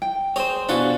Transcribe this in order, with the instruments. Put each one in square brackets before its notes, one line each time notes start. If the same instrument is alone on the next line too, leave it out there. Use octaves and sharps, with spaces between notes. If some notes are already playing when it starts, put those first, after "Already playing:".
[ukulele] G5
[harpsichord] C4 G#4 [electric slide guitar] C5 C#5
[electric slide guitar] B2 D4 [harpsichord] F4 B4 [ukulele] F#4 G#4 F#5